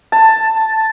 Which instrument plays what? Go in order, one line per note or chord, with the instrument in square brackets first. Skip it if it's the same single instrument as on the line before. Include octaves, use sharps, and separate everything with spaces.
[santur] A5